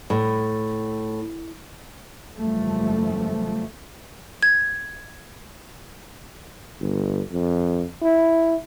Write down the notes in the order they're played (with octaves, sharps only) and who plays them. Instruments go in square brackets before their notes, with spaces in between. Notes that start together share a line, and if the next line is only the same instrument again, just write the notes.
[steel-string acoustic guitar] A2
[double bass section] F#1 E2 F3 G3 A3
[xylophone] G#6
[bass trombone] G1
F2
E4